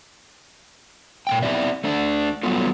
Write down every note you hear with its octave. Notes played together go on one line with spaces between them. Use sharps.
A#2 A#3 G5
B3 C4 G4 D5 E5
A3 D4
F#3 G3 B3 F4 A4